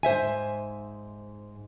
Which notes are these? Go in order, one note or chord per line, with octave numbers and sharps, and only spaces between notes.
G#2 C5 E5 G#5